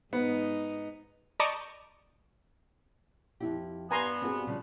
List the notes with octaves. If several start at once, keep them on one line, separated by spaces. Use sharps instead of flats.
G#2 B3 D#4
D5 D#5 A5 A#5 C#6 G6
F2 E4 G4
G2 B3 B4 G#5 A#5 C6
C4 F#4 G#4
C#3 F3 G3